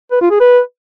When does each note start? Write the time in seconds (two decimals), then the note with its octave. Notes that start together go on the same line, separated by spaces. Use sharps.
0.12 B4
0.21 F4
0.31 G#4
0.40 B4